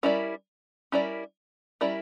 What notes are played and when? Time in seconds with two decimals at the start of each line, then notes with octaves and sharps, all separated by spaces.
0.03 G3 C#4 E4 A#4 D5
0.92 G3 C#4 E4 A#4 D5
1.81 G3 C#4 E4 A#4 D5